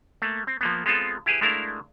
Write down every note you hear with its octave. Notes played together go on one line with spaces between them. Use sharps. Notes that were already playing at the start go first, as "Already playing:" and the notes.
A3 A#3
C4
F3 A#3 B3
G#3 B3 C4 F4 A4
E4 G4 G#4 B4
G#3 A3 D4 E4 A#4 F5